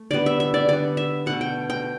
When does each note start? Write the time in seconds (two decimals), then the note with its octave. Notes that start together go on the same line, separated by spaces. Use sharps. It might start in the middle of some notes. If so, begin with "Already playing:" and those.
Already playing: A3
0.11 D3 G3 B3 D5
0.26 E5
0.40 E5
0.54 D5
0.68 D3 G3 B3 D5
0.97 E5
1.26 B2 A3 F#5
1.41 G5
1.70 G5